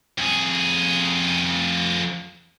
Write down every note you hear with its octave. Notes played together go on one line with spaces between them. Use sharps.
F2 G#4